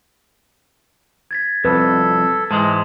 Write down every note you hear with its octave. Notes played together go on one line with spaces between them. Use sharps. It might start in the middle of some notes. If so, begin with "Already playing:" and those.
G#6 A6 B6
C2 F2 A4 B4
G#2 E3 G#3 A5 C6